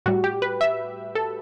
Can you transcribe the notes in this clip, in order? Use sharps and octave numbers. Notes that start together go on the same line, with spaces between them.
A2 G3 F#4
G4
B4
E5
A4